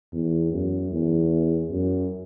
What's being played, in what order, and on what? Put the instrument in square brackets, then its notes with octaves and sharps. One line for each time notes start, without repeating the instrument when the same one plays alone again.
[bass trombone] E2
F#2
E2
F#2